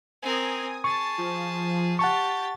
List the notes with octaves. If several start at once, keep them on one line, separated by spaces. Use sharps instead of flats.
C4 A#4 G#5 D#6
G#4 A5 C#6 A6
F3
G4 F#5 A5 C#6 A6